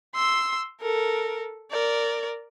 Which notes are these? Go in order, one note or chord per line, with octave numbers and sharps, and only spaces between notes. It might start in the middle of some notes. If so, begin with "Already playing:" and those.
C6 E6
A4 A#4
A#4 D5